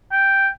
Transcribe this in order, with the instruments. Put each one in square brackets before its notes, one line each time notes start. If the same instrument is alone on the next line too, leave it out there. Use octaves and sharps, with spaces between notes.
[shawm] G5